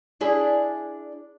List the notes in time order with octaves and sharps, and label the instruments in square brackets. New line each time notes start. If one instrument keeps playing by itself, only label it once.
[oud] D4 E4 G#4